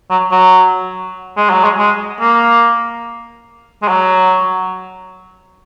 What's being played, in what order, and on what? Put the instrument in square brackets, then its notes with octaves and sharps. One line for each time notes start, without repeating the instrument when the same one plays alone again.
[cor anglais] F#3
F#3
G#3
F#3
G#3
G#3
A#3
G#3
F#3